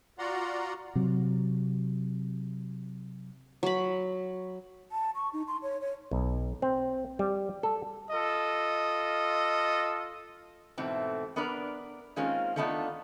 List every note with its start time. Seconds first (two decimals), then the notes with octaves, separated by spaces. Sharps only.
0.19 F4 F#4 D5 F#5 A#5 C6
0.95 C3 F#3
3.63 F#3 B5
4.92 A5
5.15 C#6
5.33 D#4
5.48 C6
5.63 C#5
5.81 C#5
6.11 B1
6.62 C4
7.19 G3
7.63 A4
8.11 F4 A4 D#5
10.78 G#2 B2 E3 A3 C4
11.36 B3 D4 A#4 B4 D5
12.16 D#3 G#3 A#3 C4 C#4 F4
12.56 D#3 A3 B3 D4 D#4 F4